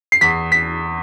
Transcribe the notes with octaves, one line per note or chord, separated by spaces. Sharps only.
C7
E2 B6
B6